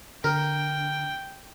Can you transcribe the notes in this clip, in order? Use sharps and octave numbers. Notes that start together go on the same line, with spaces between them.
D3 A#4 G5